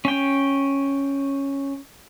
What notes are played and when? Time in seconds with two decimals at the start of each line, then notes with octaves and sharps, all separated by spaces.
0.05 C#4 G5